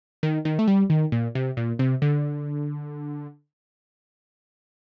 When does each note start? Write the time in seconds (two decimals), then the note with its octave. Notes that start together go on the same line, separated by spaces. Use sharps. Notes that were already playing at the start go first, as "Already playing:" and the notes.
0.23 D#3
0.45 D#3
0.59 A3
0.68 G3
0.90 D#3
1.12 A#2
1.35 C3
1.57 A#2
1.79 C3
2.02 D3